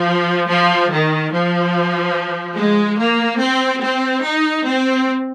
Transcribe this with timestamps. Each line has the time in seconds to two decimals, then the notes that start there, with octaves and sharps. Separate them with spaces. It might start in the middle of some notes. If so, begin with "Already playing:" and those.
Already playing: F3
0.49 F3
0.91 D#3
1.32 F3
2.57 G#3
2.99 A#3
3.41 C4
3.83 C4
4.25 D#4
4.66 C4